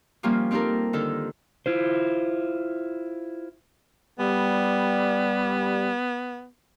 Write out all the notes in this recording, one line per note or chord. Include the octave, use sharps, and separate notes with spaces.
F3 G3 A#3 C#4 F4
C4 D#4 F4 G4 A4 A#4
D3 D#3 D#4 A4
E4 F4 C5
G3 B3